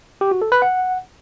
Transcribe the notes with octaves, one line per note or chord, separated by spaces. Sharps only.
G4
F#4
A4
B4
F#5